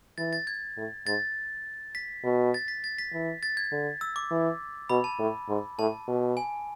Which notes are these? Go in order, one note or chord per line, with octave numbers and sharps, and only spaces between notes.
E3 A6
A6
G#6
A2
G#2 A6
B6
B2
A6
B6
A6
B6
E3
A6
G#6
D3
E6
D6
E3
B2 B5
A5
A2
G#2
A2 A5
B2
G#5